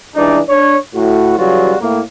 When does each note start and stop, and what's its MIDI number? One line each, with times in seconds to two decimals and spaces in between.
0.15 0.39 37
0.15 0.39 43
0.15 0.39 52
0.15 0.39 62
0.15 0.39 63
0.15 0.39 74
0.48 0.76 62
0.48 0.76 73
0.95 1.35 45
0.95 1.35 66
1.37 1.74 49
1.37 1.74 52
1.37 1.74 54
1.37 1.74 55
1.37 1.74 65
1.37 1.74 66
1.80 2.00 45
1.80 2.00 58